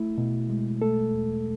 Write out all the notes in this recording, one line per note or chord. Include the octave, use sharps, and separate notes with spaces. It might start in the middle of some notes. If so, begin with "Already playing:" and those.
Already playing: A3 E4
B2
G#3
A3 A4
E2